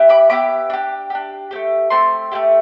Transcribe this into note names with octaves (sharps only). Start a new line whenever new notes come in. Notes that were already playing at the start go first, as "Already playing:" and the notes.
Already playing: B3 E4 G4
B5 D6
B3 E4 G4 B5 D6
D4 G4
D4 G4
A3 C4 G4
A3 C4 G4 A5 C6
A3 E4 G4